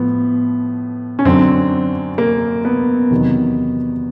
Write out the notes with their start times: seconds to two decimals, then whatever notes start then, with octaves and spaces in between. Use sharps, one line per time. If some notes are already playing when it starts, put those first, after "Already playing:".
Already playing: A2 F3 B3
1.19 C#4
1.25 F#2 D3 F#3 C4
2.18 A#3
2.65 B3
3.11 E2 C3 D#3 F#3